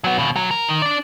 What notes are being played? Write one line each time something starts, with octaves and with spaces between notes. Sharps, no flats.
F#3 B3
D#2 B2
B1 F#3
A#4
D#3
D4 D5